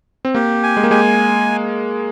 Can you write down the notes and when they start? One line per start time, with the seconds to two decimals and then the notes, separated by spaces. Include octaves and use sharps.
0.25 C4
0.35 A#3 G4
0.63 G#5
0.77 G#3
0.83 A#3
0.91 G#3 G#5